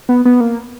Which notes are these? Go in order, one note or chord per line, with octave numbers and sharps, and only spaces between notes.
B3
B3
A#3